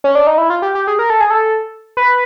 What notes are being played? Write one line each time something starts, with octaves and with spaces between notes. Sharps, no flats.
C#4
D4
D#4
E4
F4
G4
G4
G#4
A#4
A4
G#4
A4
B4